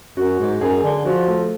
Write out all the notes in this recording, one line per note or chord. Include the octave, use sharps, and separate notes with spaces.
F#2 F#4
G#2
F#2 G#4
D3
F3 F#4
A3